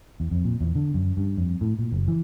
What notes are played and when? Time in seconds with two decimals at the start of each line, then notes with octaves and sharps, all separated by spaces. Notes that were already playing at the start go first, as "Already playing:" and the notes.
0.20 E2
0.31 F2
0.45 A#2
0.61 E2
0.75 D3
0.94 F#2
1.17 G2
1.37 F2
1.61 A2
1.79 A#2
1.92 F#1
2.08 E3